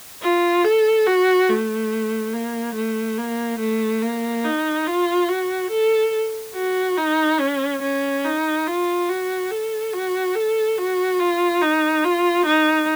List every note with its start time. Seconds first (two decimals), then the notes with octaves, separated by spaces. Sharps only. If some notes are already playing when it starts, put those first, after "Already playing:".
0.22 F4
0.64 A4
1.07 F#4
1.49 A3
2.33 A#3
2.75 A3
3.18 A#3
3.60 A3
4.02 A#3
4.44 D#4
4.86 F4
5.29 F#4
5.71 A4
6.55 F#4
6.97 D#4
7.40 C#4
7.82 C#4
8.24 D#4
8.67 F4
9.08 F#4
9.51 A4
9.93 F#4
10.35 A4
10.78 F#4
11.19 F4
11.62 D#4
12.04 F4
12.46 D#4